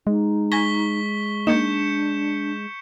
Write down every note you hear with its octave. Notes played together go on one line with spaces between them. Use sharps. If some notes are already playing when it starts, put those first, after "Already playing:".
G#3 D#4
G#5 C#6 G#6 A#6 B6 G7
A#3 D4 D#4 G6 C#7 E7